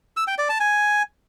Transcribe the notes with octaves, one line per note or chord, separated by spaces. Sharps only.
E6
G5
D5
A5
G#5